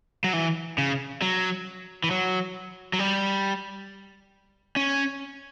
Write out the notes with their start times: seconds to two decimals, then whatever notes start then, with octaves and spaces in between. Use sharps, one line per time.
0.24 F#3
0.33 E3
0.78 C#3
1.22 F#3
2.04 E3
2.11 F#3
2.93 F#3
2.99 G3
4.76 C#4